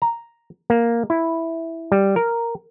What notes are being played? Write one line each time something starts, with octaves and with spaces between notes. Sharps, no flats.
A#5
A#3
E4
G3
A#4